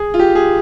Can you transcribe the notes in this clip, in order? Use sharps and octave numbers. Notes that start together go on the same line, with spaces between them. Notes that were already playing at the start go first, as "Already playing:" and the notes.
Already playing: G#4
F4
G4
G#4